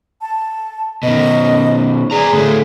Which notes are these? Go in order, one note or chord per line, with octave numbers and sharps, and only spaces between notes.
A5
B2 D#3 D#5
G#4 B4 D5 A#5
A2 D3 A3